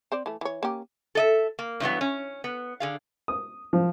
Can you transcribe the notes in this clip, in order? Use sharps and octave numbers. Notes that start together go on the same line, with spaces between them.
C4 C5 D5
E3 A3
E3 C#5
A#3 C#4 G4
A4 D#5 E5
A#3
G2 E3 F#3 B3
C#4
B3
D3 G#4 F5
D#6
F3